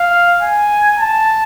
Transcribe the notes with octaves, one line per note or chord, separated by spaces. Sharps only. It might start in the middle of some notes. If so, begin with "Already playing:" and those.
Already playing: F5
G#5
A5